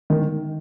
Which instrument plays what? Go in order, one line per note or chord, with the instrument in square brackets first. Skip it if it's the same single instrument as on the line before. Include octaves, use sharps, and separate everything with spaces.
[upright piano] D#3